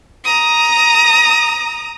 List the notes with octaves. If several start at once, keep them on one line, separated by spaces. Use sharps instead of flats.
A#5 D#6